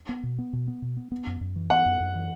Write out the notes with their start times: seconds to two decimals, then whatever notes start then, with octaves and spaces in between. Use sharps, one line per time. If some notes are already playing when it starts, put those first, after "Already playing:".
0.09 B3
0.23 B2
0.38 B3
0.53 B2
0.68 B3
0.82 B2
0.97 B3
1.12 B3
1.27 F#2
1.41 F#2
1.56 E3
1.70 B3 F#5
1.86 F#2
2.00 F#2
2.15 E3